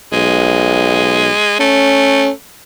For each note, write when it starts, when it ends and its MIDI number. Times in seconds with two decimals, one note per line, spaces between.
0.13 1.30 35
0.13 1.55 56
1.60 2.31 57
1.60 2.30 61